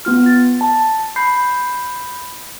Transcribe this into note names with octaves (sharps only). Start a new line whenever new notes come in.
B3 F4 F6
A6
A5
B5 G6 C7